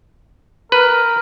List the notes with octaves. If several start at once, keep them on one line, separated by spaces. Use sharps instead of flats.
A#4 B4